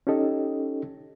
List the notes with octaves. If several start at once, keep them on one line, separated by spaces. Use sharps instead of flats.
C#4 D#4 G4 A4 D#5